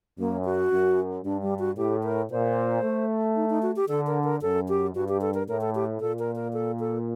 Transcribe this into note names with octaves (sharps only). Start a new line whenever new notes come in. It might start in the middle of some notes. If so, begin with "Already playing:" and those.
F#2 A#3
F#4
F#2
G2 D4
G3
F#4
A2 G4
A#4
A#2 C5
A3
D#4
D#4
F#4
G4
D3 A4
A#4
A#4
F#2 A4
G4
G2 F#4
G4
A4
A#4
A2 A#4
A4
G4
A#2 A4
A#4
A#4
A4
A4